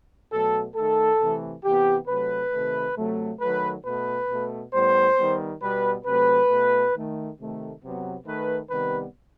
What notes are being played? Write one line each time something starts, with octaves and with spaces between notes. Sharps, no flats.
B2 F#3 A3 A4
D#3 A3 A4
C3 E3 A3
C3 E3 B3 G4
C3 F#3 A3 B4
C3 D#3 A3
C3 F#3 A3
D#3 F#3 A3 B4
B2 A3 B4
B2 A3
A2 G3 B3 C5
D#3 G3 B3
B2 G3 B3 B4
C3 F#3 A3 B4
B2 A3
D#3 A3
C3 D#3 A3
C3 F#3 B3
D#3 A3 B4
C3 D#3 G3 B3 B4